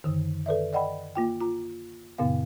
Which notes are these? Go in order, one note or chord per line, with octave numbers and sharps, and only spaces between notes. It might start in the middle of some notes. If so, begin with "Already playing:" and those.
F#2 D3 D#3
A4 B4 D5 E5
D5 D#5 F#5 G5 B5
A#3 F4 G5
F4 A#5
F#2 A#2 C#3 B3 F5